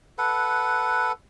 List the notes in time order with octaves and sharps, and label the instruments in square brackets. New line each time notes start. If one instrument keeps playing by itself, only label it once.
[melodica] A4 B4 F#5